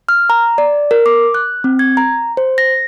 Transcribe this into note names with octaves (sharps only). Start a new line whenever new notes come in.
F6
A#5
D5
A#4
D6
F#6
C4
G#6
A#5
C5
A#6